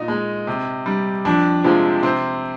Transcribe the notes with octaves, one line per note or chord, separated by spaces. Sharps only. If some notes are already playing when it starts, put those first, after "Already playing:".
Already playing: A#2 D#4
G#3
C3
G3
F2 D4
C3 F3 G#3
C3 C4